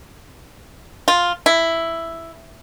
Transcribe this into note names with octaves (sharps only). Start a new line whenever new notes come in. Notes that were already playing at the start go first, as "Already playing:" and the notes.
F4
E4